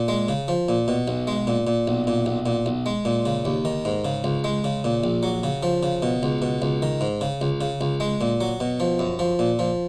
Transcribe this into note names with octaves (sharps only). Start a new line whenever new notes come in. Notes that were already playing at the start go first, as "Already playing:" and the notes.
Already playing: A#2
G#3
C#3
F3
A#2
B2
B1
G#3
A#2
A#2
B1
A#2
B1
A#2
B1
G#3
A#2
C#3
D#2
D#3
G#2
C#3
C#2
G#3
C#3
A#2
A#1
F#3
C#3
F3
C#3
B2
C#2
B2
C#2
D#3
G#2
C#3
C#2
C#3
C#2
G#3
A#2
F#3
B2
F3
F#2
F3
A#2
F3